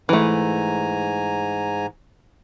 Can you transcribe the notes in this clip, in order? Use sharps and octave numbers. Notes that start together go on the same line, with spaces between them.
G#2 E3 A3 G#5 A#5